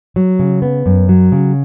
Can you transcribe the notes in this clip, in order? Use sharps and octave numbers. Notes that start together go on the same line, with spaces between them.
F#3
C#3
B3
F#2
F#3
C#3